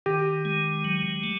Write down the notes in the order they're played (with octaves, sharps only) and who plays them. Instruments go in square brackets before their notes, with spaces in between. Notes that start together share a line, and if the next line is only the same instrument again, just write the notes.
[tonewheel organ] D#3 [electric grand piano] G4
[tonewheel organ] G#3
F#3
A3